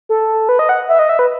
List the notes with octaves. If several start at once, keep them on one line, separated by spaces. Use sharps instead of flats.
A4
B4
D#5
F#5
E5
D#5
E5
B4